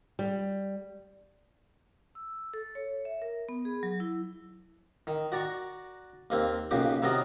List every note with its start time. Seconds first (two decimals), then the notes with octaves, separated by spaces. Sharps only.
0.19 G3
2.15 E6
2.54 A4
2.75 C#5
3.05 E5
3.22 A#4
3.49 B3
3.65 G#4
3.83 F#3
4.00 E4
5.07 D#3
5.32 F#4 D5 A#5 C#6
6.30 D#2 A#3 C4
6.71 B1 A#2 C#3 F#4 G4
7.02 C3 D#3 F#3 B3 A#4 D#5